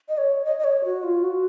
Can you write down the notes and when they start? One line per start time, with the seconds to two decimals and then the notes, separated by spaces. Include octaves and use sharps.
0.09 D#5
0.18 C#5
0.45 D#5
0.59 D#5
0.64 C#5
0.84 F#4
1.04 F4
1.24 F#4